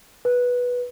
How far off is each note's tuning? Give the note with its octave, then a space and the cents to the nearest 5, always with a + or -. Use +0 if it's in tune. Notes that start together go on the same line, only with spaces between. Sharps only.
B4 -10